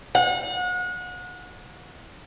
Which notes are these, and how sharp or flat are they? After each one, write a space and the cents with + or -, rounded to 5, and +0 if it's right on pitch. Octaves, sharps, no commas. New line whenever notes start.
F#5 -35